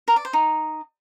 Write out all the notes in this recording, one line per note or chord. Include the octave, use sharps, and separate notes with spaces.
A#4
D5
C5
D#4